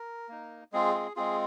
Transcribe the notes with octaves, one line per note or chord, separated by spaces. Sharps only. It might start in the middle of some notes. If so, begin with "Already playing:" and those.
Already playing: A#4
A#3 D#4
G#3 C4 F4 G#4
G#4
G#3 C4 F4 G#4